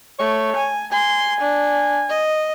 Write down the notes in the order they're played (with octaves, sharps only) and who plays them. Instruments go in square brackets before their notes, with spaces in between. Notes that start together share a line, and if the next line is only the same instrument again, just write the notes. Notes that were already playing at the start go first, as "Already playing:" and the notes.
[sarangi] A3 [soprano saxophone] C#5
[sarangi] G#5
[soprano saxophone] G#5 [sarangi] C6
[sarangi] D4
D#5